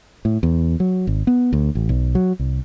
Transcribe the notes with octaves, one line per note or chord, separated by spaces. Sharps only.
A2
E2
F#3
G#1
B3
D2
A1
B1
F#3
C2